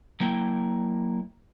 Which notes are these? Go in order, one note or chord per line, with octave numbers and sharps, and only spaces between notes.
F#3 A#3 E4 G5